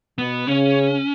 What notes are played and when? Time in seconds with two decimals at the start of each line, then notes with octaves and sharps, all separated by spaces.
0.18 B2 B3
0.47 C#3 C#4